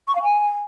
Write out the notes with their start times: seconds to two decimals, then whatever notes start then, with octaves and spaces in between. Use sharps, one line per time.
0.08 C#6
0.15 F5
0.23 G#5